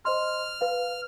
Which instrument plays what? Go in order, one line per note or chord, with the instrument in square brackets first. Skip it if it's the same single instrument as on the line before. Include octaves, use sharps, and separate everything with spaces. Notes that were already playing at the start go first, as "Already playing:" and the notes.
[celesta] C5 D#5 C6 [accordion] F6
[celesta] B4 F5